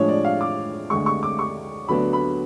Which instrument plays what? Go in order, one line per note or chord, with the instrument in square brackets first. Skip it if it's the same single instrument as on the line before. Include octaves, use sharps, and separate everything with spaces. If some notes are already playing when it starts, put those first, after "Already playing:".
Already playing: [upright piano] A2 F3 G#3 D4 C#5
D5
F5
D6
D2 D3 G#3 C#6
C#6
D6
C#6
D2 D3 F#3 B3 D4 B5
B5